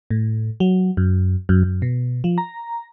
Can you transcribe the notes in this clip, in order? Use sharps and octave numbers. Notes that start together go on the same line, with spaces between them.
A2
F#3
F#2
F#2
F#2
B2
F3
A#5